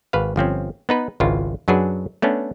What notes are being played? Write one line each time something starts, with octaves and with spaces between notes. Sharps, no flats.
G#1 B4 F5
G1 F3 C4 C#4
B3 D#4 B4
G#1 C#2 E4 F4
F#2 F#3 D4 G#4 B4
A3 B3 C#4 D4